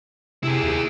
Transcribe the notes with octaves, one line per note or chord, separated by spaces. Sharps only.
C3 E4 G#4
D#2